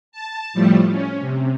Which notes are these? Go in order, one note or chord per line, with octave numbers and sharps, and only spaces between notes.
A5
A2 F3 G3 A3
C#4
C3